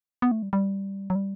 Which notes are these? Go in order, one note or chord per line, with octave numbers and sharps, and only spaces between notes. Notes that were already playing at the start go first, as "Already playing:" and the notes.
B3
A3
G3
G3
F#3
G3